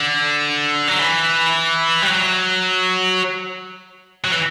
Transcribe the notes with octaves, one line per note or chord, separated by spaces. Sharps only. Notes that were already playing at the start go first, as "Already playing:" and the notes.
Already playing: D3
F#3
E3
G3
F#3
F#3
E3